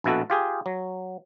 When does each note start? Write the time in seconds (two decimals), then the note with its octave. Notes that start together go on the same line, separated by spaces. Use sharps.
0.04 A#1 B2 E4 F#4 A4
0.30 F4 G4 G#4
0.66 F#3